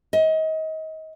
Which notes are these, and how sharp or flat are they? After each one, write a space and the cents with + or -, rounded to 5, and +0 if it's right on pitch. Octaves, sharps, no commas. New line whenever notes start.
D#5 +30